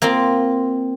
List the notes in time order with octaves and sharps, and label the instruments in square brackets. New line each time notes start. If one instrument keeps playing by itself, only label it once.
[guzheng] A#3 C4 F4